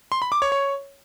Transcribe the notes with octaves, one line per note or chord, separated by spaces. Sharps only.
C6
B5
D6
C#5
C#5